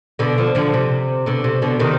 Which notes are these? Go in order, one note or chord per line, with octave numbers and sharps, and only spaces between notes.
B2 D3
D3 F3
D3 F3
C3
B2 D3
C3
B2 D3
C3 D#3